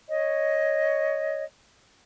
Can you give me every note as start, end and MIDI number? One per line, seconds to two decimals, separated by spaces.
0.08 1.43 73
0.08 1.43 75